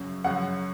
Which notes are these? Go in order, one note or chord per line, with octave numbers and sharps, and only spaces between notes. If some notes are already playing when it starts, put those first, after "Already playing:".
Already playing: F#2 C#3 F#3
F#2 C#3 F#3 F#5